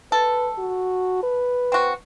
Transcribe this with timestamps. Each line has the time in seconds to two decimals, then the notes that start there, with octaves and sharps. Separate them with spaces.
0.12 A4 B4
0.58 F#4
1.23 B4
1.72 C4 F#4